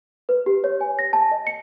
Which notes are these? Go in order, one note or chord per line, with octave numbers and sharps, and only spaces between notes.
B4
G4
C#5
G#5
A#6
A5
D#5
C#7